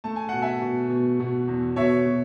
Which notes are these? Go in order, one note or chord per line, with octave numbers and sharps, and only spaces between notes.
A3 A5
G#5
B2 F#5
E5 G#5
B2
B2
B2
E2
B2 C#5 E5
B2